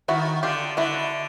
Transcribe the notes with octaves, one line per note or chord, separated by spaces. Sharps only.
D#3 E4 F#4
D3 F4 G4
D3 E4 F#4